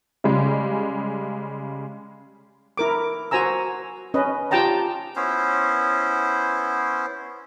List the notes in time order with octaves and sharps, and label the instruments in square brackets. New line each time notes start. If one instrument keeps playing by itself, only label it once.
[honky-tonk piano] C#3 G3 G#3
[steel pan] E4 A#4 D6
F#4 C5 G#5 A#5 E6
C#4 B4 D#5
F4 G4 G5 A5 A#5
[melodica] B3 C#4 E4 C5